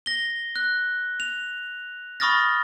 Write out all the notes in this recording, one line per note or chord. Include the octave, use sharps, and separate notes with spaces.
A#6 G7
F#6
F7
B5 C#6 D#6 F6 A6 A#6